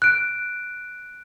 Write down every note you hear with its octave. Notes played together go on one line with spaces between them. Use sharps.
F#6 D7